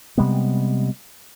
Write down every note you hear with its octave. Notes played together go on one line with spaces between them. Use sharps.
C3 G3 G#3 B3